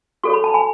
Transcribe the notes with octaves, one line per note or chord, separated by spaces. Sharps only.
F#4 A4 C#5 C#6
B5
A5
G#5 B5